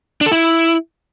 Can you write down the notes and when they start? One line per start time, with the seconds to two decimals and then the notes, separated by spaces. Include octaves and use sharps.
0.21 D4
0.26 A4
0.32 E4